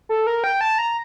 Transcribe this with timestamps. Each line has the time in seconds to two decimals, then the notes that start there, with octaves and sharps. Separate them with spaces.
0.09 A4
0.27 A#4
0.44 G5
0.61 A5
0.78 A#5